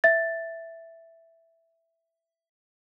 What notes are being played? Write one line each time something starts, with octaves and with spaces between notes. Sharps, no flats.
E5 A6